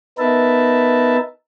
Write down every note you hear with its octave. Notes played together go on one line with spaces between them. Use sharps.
B3 D#4 A#4 B4 E5 A5